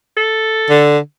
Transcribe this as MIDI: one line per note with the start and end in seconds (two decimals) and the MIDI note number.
0.17 0.82 69
0.70 0.98 50